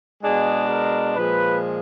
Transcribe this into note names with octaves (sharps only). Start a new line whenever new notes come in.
B2 G#3 D4 G#4
A#4
A#2 F3 G#3 B4